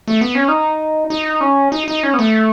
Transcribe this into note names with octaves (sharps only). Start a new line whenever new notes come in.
A3
B3
C#4
D#4
D#4
C#4
D#4
D#4
C#4
B3
A3